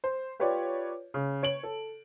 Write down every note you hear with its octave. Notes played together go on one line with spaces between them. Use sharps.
C5
F4 G4 B4 C#5 D5
C#3
C#5 D7 F#7
A4